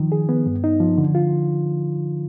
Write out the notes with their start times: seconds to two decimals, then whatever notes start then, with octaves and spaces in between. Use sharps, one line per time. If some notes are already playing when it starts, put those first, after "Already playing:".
Already playing: D#3 F3
0.12 G#4
0.29 B3
0.46 G2
0.64 D#4
0.80 F3
0.98 D3
1.15 F4